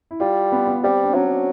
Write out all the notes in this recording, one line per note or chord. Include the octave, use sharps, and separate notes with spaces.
E4
G3 F4
B3
B3
G3 C4
D4
F#3 C#4